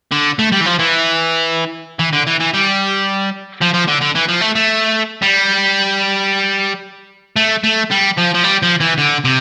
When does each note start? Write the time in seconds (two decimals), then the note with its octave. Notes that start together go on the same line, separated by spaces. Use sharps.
0.12 D3
0.39 A3
0.52 G3
0.61 E3
0.66 F3
0.79 E3
1.99 E3
2.13 D3
2.27 E3
2.40 E3
2.54 G3
3.61 F3
3.74 F3
3.88 D3
4.01 D3
4.15 E3
4.28 F3
4.41 A3
4.55 A3
5.22 G3
7.36 A3
7.64 A3
7.91 G3
8.17 F3
8.34 F3
8.44 G3
8.63 F3
8.80 E3
8.98 D3
9.25 C3